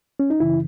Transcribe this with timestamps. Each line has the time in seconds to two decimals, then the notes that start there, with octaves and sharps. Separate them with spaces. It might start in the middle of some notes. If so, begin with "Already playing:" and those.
0.20 C#4
0.30 D#4
0.40 F#2 C#3 E3 E4